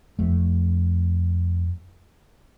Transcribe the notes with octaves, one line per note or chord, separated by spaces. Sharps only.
F2 A3